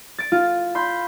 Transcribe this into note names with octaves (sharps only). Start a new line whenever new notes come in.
A6 D7
F4
B5 C6 G6